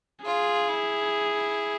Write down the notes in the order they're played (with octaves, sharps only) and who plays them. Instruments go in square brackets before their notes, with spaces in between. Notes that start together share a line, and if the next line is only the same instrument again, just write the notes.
[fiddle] F4 [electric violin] G#4
[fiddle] E4